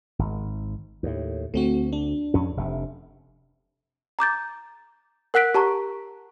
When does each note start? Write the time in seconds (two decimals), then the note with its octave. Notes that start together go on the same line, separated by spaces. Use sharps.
0.19 G#1
1.03 D#2 A2
1.54 D2 A3 C4 F#4
1.93 D4
2.34 F2 C#4
2.57 F1 C3
4.19 A#5 D6 G6 A6
5.34 A#4 F#5 F#6 B6 D7
5.55 G4 A5 A#5 C#6